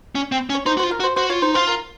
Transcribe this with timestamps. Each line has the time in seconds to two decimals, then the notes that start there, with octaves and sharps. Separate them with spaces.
0.15 C#4
0.32 C4
0.50 C#4
0.55 C#5
0.66 D#4 C5
0.77 F#4 C5
0.84 F4
0.91 A#4
1.00 F#4
1.04 C5
1.16 F#4 C5
1.29 F4 C#5
1.42 D#4 C5
1.54 F4 C5
1.67 A#4